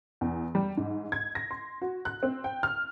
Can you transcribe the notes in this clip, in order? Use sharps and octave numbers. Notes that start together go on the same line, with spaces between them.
E2
G3
G#2
G#6
A#6
C6
F#4
F#6
C4
G5
F6